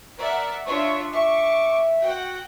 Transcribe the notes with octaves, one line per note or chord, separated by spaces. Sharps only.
A#4 D5 E5 F#5
D4 F4 C#5 E5 C#6
E5 C#6 D6 C#7
F#4 F#5 G5